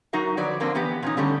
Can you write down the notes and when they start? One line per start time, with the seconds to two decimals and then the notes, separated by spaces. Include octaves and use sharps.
0.13 F#3 D#4 F#4 A#4 E5
0.37 D3 F3 F#3 B4 D5
0.60 D3 F3 A#3 C4 D4
0.75 E3 B3 G4 B4
1.03 A#2 C#4 D#4
1.17 D3 G3 A3 C#4